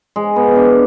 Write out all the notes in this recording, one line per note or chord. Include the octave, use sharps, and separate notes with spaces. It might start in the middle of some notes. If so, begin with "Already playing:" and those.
G#3
B3
D4